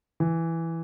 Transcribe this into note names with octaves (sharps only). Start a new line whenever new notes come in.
E3